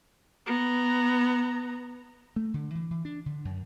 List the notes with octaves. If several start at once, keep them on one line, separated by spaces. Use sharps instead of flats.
B3 A#5
A3
D3
E3
E3
D4
D3
F#2